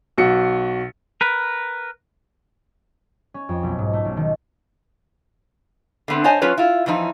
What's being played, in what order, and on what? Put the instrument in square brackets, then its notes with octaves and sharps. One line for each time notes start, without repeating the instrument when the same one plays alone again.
[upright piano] B1 F#4 C#7
[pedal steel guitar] A#4 B4
[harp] C#4
F2
B1
G#2
A3
B1
D#3
[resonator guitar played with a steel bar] D3 A3 B3 C4
C5 C#5 D#5 G#5 A5
F#3 C#4 F4 B4 C#5
E4 F4
E2 E3 F3 D#4